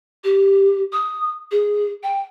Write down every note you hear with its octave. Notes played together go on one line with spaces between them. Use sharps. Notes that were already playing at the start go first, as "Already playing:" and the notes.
G4
D#6
G#4
G5